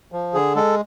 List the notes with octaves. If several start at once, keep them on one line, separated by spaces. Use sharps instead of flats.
F3
D3 G#4
G#3 A4